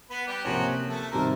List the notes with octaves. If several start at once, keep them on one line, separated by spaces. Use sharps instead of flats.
B3 B4
G3 G4
C3 F3 F#3 A#3 C#4 F#4
A3 A4
C3 D#3 G3 A#3 C4 A#4